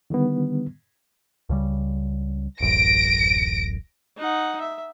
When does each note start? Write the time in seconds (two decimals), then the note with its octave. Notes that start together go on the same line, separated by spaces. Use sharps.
0.10 D3 D#3 G3 B3
1.49 C#2 C#3 G3
2.60 D1 A1 F#2 A#6 D7
4.17 D#4 F#5
4.61 E5